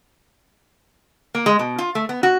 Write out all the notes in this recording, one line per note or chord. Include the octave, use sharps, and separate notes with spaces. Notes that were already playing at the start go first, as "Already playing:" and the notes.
A#3
G#3
B2
F4
A3
B3
F#4